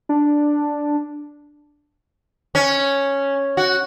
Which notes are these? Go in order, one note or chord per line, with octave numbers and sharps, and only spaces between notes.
D4
C#4
F#4